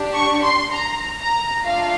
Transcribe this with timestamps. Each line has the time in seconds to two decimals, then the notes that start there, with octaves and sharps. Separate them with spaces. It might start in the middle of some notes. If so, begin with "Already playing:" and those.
Already playing: D4 G4
0.14 C#6
0.44 C6
0.74 A#5
1.19 A#5
1.64 A3 D4 F4 F5